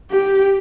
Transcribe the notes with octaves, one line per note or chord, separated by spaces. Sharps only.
G4